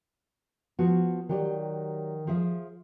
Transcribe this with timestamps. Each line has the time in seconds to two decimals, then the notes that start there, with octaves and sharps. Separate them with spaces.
0.79 F3 B3 F#4
1.29 D#3 F#3 G4 D5
2.27 F3 G#4 E5